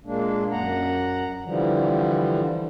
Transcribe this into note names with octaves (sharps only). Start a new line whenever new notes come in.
A#2 G#3 A#3 D4
F#2 F#5 A#5
D3 E3 F3 G3